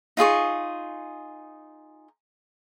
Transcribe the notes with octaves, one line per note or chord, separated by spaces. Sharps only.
D#4 F4 G#4 C#6